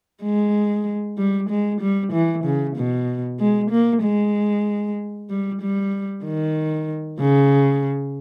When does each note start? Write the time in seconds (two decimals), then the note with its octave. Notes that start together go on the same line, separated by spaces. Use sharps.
0.23 G#3
1.18 G3
1.50 G#3
1.81 G3
2.13 E3
2.45 C#3
2.77 B2
3.40 G#3
3.71 A#3
4.03 G#3
5.30 G3
5.62 G3
6.25 D#3
7.20 C#3